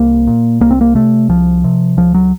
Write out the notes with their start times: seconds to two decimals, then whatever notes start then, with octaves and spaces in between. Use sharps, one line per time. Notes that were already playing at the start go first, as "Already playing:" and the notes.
Already playing: C2 A#3
0.27 A#2
0.61 C2 A#3
0.71 C4
0.81 A#3
0.95 C3 A3
1.29 C2 F3
1.64 C3
1.97 C#2 F3
2.14 F#3